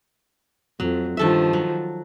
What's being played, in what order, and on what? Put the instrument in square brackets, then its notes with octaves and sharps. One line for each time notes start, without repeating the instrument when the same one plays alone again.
[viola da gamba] F2 [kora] F#3
[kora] G2 A4 E5 [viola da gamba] D#3 F3
[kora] F#3